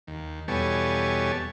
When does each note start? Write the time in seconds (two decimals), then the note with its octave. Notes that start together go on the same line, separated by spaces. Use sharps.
0.07 D#2
0.48 E2 B2 G3 A4 C#5 G#5